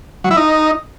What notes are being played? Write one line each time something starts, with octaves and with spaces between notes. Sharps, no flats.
F#3
E4
D#4